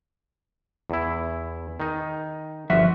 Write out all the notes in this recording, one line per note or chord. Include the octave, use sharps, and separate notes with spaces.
E2 E4
D#3 D#4
G1 F3 F#4 E5